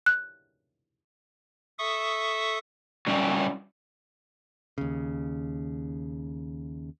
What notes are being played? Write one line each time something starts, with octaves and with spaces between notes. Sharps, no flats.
F#6
A4 E5 C#6 D#6
F#3 G3 C#4 E4 G5
D#2 C#3